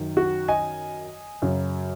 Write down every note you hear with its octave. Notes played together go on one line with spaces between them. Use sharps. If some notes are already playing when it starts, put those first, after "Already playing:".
Already playing: F#2 D#3 F#3
F#4
D#5 G#5
F#2 C#3 F#3